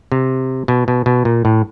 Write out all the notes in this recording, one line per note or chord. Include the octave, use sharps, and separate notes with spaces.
C3
B2
B2
B2
A#2
A2